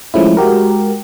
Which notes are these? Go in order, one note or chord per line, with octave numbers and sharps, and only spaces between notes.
F3 G#3 A3 C#4 E4
G#3 F#4 G4 A#4